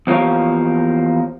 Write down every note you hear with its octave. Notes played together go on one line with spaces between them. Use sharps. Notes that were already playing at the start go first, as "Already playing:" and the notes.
E2 F3 A#3 G4 C#5